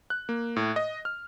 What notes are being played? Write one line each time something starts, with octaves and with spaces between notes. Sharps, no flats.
F#6
A#3
A2
D#5
F6